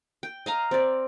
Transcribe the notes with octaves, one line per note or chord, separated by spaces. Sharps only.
G5
D#5 F5 A#5
C4 D5